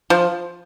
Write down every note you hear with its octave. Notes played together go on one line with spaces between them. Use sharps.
F3